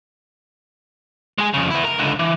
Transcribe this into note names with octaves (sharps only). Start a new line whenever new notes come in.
G#3 G#4
F2 C#3
B3 E4
A#4 A#5
C#2 D3
E3